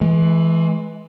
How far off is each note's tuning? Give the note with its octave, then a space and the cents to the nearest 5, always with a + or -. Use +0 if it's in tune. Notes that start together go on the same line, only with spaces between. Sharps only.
E3 +0 G#3 +40